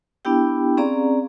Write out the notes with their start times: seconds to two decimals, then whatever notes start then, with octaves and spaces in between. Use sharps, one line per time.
0.25 B3 D4 E4 G4 G5
0.77 C4 C#4 G#4 D5 F5 A#5